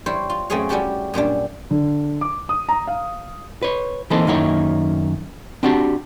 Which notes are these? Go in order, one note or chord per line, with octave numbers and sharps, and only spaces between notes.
G3 E4 C5 C#5
F4
F#2 A3 C4 C#4 G#4 F5
G3 C#4 E4 F#4 G4 A4
F#2 A#2 G3 D4
D3
D6
D#6
A#5
F5
B4 C#5
E3 A#3 C4 D#4 A4
F#2 D#3 A#3 D#4 E4 C#5
C4 D4 F#4 G4 A5